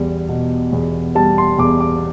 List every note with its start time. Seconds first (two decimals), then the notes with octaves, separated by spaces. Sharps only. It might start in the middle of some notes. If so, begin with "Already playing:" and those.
Already playing: E2 G3
0.29 B2
0.73 E2
1.15 G3 A5
1.38 C6
1.59 E2 D6
1.80 D6